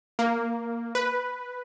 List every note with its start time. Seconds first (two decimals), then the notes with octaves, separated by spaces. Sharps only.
0.19 A#3
0.95 B4